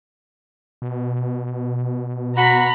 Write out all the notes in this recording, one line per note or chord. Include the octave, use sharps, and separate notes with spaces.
B2
F#4 A#5 B5